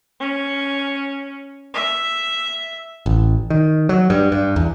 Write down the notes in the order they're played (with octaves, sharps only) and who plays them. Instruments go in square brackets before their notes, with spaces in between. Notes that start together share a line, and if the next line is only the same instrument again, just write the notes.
[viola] C#4
E5
[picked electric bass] A1
D#3
F#3
G2
G2
E2